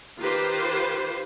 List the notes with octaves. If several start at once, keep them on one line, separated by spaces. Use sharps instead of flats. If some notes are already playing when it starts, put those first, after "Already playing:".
D#3 F4 G4 B4 C5